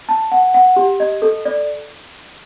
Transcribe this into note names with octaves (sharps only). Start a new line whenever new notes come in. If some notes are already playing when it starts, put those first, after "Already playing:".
A5
F#5
F#5
G4
D#5
A4
D5